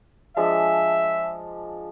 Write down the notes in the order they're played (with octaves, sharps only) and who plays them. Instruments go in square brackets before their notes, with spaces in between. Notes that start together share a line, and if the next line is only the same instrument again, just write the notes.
[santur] F3 G#3 D4 [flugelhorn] E5